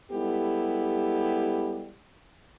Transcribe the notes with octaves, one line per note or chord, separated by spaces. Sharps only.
G3 G#3 B3 E4 G4 A4